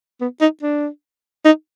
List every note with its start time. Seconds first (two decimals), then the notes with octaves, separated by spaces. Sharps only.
0.21 B3
0.41 D#4
0.63 D4
1.45 D#4